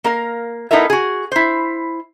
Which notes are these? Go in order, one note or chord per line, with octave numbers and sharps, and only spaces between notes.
A#3 A#4 F5
B3 D#4 E4 A4 A#4 E5
F#4 G#4
E4 C5